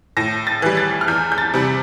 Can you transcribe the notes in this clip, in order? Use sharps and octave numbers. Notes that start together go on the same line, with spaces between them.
A2 A#6
A6
E3 G3
A6
F6
E2 G6
G6
A6
C3 G3